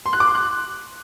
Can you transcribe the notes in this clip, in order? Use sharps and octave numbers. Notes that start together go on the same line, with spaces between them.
C6
F#6
D6
C6
F#6